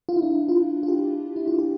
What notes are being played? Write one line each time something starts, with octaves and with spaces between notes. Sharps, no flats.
F4
E4
D4
E4
F4
F4
G4
E4
F4
G4